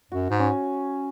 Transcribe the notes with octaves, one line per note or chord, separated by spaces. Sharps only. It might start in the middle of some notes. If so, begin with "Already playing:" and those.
F#2 F#4
G#2
C#4